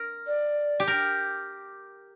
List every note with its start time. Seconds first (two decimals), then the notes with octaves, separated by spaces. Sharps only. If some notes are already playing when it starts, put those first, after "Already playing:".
Already playing: A#4
0.27 D5
0.80 G4
0.88 A#4